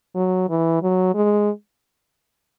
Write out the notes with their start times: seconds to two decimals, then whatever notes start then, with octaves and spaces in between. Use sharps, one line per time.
0.16 F#3
0.49 E3
0.82 F#3
1.15 G#3